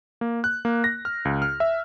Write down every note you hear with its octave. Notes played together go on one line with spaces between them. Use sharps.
A#3
F#6
A#3
A#6
F6
C#2
F6
E5